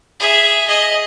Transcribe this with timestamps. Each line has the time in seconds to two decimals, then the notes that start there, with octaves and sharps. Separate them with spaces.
0.20 G#4 E5
0.67 G#4 D#5